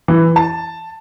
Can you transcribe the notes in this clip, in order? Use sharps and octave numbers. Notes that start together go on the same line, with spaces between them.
E3
A5